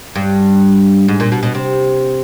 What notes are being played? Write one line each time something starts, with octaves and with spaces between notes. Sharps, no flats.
G2
G#2
A#2
B2
B2
C3